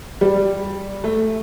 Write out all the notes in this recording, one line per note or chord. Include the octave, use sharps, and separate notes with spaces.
G3
A3